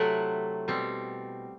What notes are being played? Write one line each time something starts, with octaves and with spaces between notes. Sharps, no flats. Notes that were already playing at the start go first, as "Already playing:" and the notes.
Already playing: C3 F#3 A3 E4 F#5
B2 G3 C4